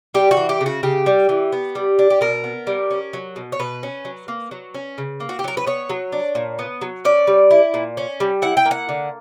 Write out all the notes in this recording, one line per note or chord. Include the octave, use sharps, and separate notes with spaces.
G3 G4
F#4
E3
G4
C#3
F#4
C#3 G4
G3
E3
B3
G3
D4
G4
B2 A#4
B3
G3
C#4
F#3
B2
C#5
B2 B4
C#4
F#3
A#3
F#3
C#4
C#3
A#3
F#4
G4
F#3 A#4
B4
B3 C#5
F#3
D4
A#2
B3
F#3
C#4 D5
G3
E4
A#2
C#4
G3
E4 F#5
G5
A#3
F#5
D3